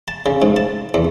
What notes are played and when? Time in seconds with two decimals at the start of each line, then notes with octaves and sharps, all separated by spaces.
0.08 A5
0.26 C#3
0.42 G#2
0.56 A5
0.94 E2